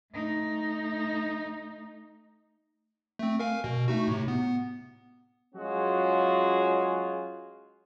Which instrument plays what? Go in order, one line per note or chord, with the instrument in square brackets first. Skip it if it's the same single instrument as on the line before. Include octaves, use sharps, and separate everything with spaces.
[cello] A3 D#4
[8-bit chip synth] A3 C4
A#4 F5 G#5
B2
A3 D#4 F#4
A2 C3
B3
[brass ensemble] F#3 G#3 C#4 F4 F#4 G#4